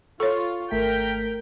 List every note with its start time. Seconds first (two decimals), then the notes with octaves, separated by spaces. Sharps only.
0.20 F4 A4 C#5 C#6
0.71 G#1 A3 A#4 G5 B6